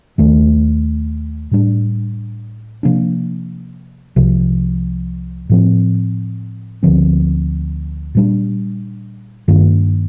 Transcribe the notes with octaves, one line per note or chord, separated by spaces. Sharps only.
D#2 D#3 A3
A2 G3 D4
C3 F3 A#3 D4
C2 C3 F3
A2 F3 C4
D2 D3 F3 C4
A#2 G3 D4
G2 D#3 A#3 D4